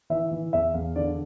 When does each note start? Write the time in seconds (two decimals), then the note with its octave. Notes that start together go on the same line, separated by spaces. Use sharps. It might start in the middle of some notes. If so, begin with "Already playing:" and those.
0.10 E3 E5
0.31 E3
0.53 E2 E5
0.74 E2 F5
0.96 D3 D5